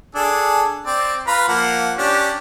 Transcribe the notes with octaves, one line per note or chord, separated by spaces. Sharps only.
D4 G#4 A4
C4 D5
F4 B4 A#5
F3 A#3 F#5
C#4 D4 G4